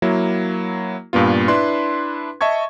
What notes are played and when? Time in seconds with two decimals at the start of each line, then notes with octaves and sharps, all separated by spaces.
0.02 F#3 A#3 E4
1.13 G2 A#2 B3 F4
1.48 D4 E4 B4 C6
2.41 D#5 E5 A5 C#6 G#6